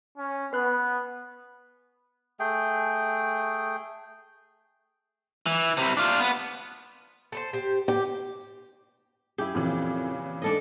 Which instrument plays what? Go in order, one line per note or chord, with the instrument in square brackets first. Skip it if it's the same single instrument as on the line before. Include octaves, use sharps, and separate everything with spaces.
[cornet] C#4
[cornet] B3 [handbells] B4 F#6
[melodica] A3 G#4 G5
[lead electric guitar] E3
C3 E4
D4 F4
B3
[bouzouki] A4 B4 C5
G4 C5
[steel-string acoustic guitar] G4 [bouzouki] G5
[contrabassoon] F#2 [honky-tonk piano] E4 G#4 [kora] G4
[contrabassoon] F2 [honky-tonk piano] A#2 C#3 E3
[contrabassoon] G#2 [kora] D4 A4 D#5